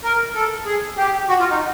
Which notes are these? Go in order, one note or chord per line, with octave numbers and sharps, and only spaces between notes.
A#4
A4
G#4
G4
F#4
F4
D#4